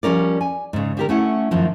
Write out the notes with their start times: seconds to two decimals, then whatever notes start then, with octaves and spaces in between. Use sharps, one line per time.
0.03 F3 G3 C#4 A#4 D5
0.41 G#5
0.73 G#2 C#3
0.97 D3 G4 A#4
1.09 A3 C#4 E4 F#5
1.51 F#2 A2 D#3 F3